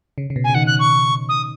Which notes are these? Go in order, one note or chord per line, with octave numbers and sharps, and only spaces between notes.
C#3
C#3
B2
G#5
C#3
D#3 F#5
F#6
C#6
D#6